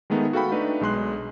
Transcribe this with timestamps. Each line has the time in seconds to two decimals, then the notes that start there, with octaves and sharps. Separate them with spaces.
0.10 D#3 G#3 A3 B3 D#4
0.33 F#4 A4 F5 G5 B5
0.52 A3 D4 D#4 B4
0.81 B1 G#3 C6 F#6